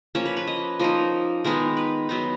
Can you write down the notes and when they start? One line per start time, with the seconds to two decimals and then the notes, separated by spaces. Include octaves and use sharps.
0.15 F3 A#3 C#4 C#5
0.26 B4
0.37 B4
0.47 D#5
0.80 F3 A#3 D#4 D#5
1.44 D#3 G#3 B3 D#4 A#4
1.77 B4
2.09 F#3 B3 D#4